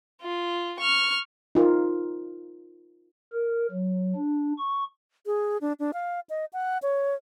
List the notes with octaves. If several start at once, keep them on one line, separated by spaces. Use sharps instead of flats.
F4
C#6 F6
D#4 F4 A#4
A#4
F#3
D4
C#6
G#4
D4
D4
F5
D#5
F#5
C#5